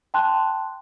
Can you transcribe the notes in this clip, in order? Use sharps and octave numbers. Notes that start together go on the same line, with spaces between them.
G5 A5 C6 F#6